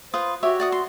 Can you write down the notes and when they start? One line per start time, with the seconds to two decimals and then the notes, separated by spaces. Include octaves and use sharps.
0.14 F4 B4 C5 D#6
0.43 F#4 G4 C#5 E5
0.60 D5 F#5 D#6
0.72 C6